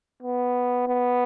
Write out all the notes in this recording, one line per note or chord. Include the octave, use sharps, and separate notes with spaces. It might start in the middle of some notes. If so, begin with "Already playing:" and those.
B3
B3